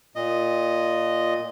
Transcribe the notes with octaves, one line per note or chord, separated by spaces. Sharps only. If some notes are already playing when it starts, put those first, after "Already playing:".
A#2 D#5